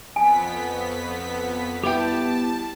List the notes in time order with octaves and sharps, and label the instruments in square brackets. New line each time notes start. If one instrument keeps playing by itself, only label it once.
[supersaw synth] F2 B3 B6 [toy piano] G#5
[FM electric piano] G3 B3 E4 [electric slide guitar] G4 G5 [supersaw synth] A5